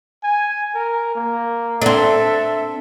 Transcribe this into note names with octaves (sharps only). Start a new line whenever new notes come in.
G#5
A#4
A#3
C4 D4 A4 E5